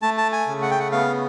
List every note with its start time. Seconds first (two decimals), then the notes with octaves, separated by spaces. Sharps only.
0.02 A3 A5
0.18 A5
0.32 G#5
0.48 C#3
0.62 F#5
0.71 G5
0.79 F#5
0.92 B3 F5